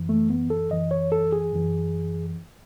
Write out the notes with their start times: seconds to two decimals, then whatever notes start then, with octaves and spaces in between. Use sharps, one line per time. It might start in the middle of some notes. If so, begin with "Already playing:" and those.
Already playing: F#2 E3
0.09 A3
0.30 B3
0.50 A4
0.71 F#2 E3 D#5
0.91 C#5
1.12 A4
1.32 G#4
1.53 F#2 E3